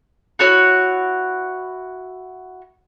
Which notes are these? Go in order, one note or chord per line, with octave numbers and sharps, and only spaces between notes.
E4 F#4 C#5 F#5